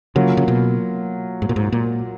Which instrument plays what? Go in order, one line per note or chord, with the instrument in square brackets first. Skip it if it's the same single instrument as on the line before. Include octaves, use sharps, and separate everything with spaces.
[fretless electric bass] C#3 [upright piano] F#3 A#3 F4
[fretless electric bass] C#3
B2
G#2
A#2
G#2
A#2